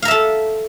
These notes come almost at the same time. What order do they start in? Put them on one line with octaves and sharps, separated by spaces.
F5 A#5 E5 A4